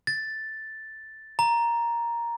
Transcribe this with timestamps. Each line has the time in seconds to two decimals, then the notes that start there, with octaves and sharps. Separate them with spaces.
0.07 A6
1.39 A#5